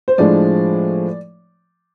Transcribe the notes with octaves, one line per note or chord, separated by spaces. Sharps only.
C5
A2 F3 G#3 D4 D5